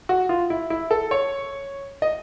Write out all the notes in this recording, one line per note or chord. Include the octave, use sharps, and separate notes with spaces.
F#4
F4
E4
E4
A4
C#5
D#5